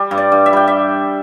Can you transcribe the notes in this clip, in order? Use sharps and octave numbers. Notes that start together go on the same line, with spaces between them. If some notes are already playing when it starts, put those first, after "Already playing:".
Already playing: G3
G2
D5
G2
E5
G3 G5
E5